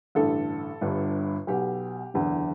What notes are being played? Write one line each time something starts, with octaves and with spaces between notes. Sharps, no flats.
A1 G2 D3 A4
G1 G2 D3
B1 B2 G4
F#1 E2 D3